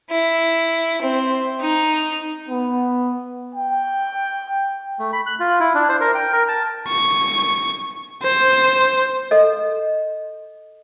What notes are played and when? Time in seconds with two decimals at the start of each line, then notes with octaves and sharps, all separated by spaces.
0.10 E4
1.02 C4
1.61 D#4
2.49 B3
3.54 G5
4.99 A3
5.13 B5
5.26 F#6
5.40 F4
5.60 E4
5.75 D4
5.89 C5
6.00 A#4
6.15 G5
6.33 A#4
6.48 A5
6.88 C#6
8.23 C5
9.31 A4 D#5